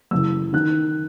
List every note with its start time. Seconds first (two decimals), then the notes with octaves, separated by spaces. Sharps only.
0.11 F#2 C#3 E3 E6
0.53 D#3 F#6